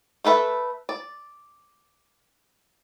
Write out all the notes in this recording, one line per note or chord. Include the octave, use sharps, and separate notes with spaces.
A3 A4 B4 E5
D5